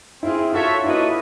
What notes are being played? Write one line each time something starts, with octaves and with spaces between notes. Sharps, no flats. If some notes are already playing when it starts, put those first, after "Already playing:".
C4 E4 F4 G#4
F4 F#4 A4 C#5 E5
A#3 D4 E4 F#4 B4 D#5